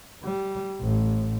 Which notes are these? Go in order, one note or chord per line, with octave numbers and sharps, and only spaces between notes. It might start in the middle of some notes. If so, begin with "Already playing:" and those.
G3
A1